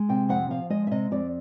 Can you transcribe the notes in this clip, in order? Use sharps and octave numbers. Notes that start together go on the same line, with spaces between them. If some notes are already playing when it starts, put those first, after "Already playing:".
Already playing: G#3
C3 G5
F2 F#5
F3 F5
G#3 D#5
E5
C3 D#5
F2 D5